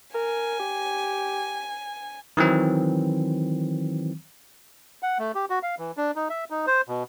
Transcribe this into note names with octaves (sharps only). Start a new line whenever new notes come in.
A#4 G#5
G4
D#3 E3 F#3 C4
F#5
A3
G4
F#4
F5
E3
D4
D#4
E5
D#4
C5
B2